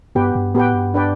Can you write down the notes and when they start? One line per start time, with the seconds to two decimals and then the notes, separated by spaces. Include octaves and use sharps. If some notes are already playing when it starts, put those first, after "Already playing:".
0.15 G2 B3 G4 B4 G5
0.35 G2
0.55 A2 B3 G4 B4 G5
0.74 G2
0.94 D4 B4 D5 G5